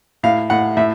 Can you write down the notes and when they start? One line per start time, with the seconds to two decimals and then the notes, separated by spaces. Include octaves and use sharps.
0.23 A2 F5
0.50 A2 F#5
0.77 A2 E5